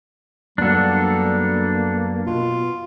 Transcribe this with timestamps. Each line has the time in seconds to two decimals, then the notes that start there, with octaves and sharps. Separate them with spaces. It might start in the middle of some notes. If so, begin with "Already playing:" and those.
0.58 F#2 G3 A#3 B3 D4 F#4 A4
2.27 B2 F4